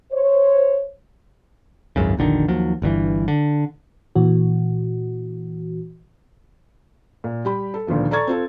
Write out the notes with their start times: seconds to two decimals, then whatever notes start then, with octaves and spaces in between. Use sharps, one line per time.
0.12 C5 C#5
1.96 G#1 C#2 F#2 C#3
2.17 F1 A#1 D3 D#3
2.48 D#2 F3 F#3
2.82 G1 G2 B2 E3
3.28 D3
4.15 A#2 E3 F#4
7.24 A#2
7.45 G3 G4 B5
7.74 A4
7.87 D2 A#2 D#3 F3 B3
8.11 A4 D5 A#5 C#6 G#6 A6
8.27 C4 F4 A4